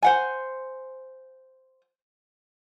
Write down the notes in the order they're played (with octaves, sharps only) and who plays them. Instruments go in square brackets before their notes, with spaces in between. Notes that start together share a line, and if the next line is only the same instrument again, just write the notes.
[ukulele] C5 F#5 G#5